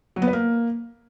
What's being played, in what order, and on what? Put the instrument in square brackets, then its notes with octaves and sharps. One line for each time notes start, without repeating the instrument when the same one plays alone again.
[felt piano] F#3
B3
B4
A#3